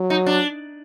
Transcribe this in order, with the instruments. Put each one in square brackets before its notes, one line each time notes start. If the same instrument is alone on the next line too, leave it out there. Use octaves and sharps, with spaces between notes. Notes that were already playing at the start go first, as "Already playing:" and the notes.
Already playing: [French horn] F#3
[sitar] D#4
D4